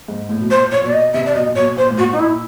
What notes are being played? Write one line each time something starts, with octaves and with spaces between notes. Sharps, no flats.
G#2
A2
B2
A#2 C5
A#2 C#5
B2 D5
D#5
C3 E5
D5
B2 D#5
A#2
B2 C#5
A#2 C5
A2
A#2 F#4
D#4
A#2 E4